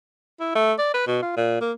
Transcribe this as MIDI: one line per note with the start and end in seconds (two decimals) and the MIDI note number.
0.40 0.54 64
0.55 0.73 57
0.78 0.91 74
0.94 1.07 71
1.07 1.18 47
1.22 1.37 65
1.37 1.59 46
1.61 1.72 58